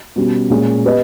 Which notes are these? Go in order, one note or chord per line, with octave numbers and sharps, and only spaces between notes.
B2 G3 C#4
A#2 G#3 C#4
B3 G4 B4 D#5